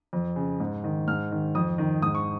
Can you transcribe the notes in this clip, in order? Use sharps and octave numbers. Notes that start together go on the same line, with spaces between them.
F2
C#3
G#2
D#3
G#2 F6
D#3
F2 D#6
D#3
G#2 D#6
C#6